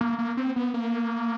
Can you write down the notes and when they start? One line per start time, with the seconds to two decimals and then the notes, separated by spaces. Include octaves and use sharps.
0.01 A#3
0.19 A#3
0.37 C4
0.56 B3
0.74 A#3